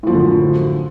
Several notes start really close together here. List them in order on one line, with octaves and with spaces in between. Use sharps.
A2 F3 F#2 D3